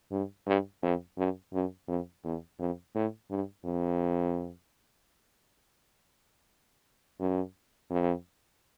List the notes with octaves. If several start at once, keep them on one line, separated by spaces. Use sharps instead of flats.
G2
G2
F2
F#2
F#2
F2
E2
F2
A2
G2
F2
F#2
F2